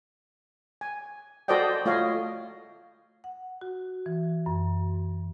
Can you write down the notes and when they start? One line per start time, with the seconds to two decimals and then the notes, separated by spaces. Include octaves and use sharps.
0.81 G#5
1.48 F#4 A4 C5 D5 D#5 G5
1.86 A3 F4 C#5 D#5 F5
3.24 F#5
3.61 F#4
4.06 E3
4.46 F#2